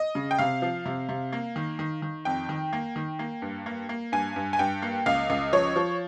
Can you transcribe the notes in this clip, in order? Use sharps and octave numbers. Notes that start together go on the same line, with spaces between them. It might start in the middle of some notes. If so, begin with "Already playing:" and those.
Already playing: D#5
C#3
G5
C3 F5
F3
C3
C3
A#3
D#3
D#3
D#3
F2 G5
D#3
A#3
D#3
A#3
G2
A#3
A#3
G2 G#5
G2
G#5
G2 G5
A#3
C#2 F5
C#2
F3 C#5
F3